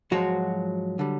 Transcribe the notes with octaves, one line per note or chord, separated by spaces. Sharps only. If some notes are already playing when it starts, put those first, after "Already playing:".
G#2 F3 F#3 G#3 F#4
D3 G3